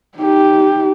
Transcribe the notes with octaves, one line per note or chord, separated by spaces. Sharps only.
D#4 G4